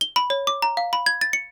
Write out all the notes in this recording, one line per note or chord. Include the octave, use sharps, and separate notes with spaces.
G7
B5
C#5
D6
A#5
F5
B5
G#6
A6
C#7